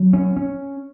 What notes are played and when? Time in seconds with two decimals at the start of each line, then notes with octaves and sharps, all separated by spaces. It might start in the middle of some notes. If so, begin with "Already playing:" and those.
Already playing: F#3
0.13 C#4
0.37 C#4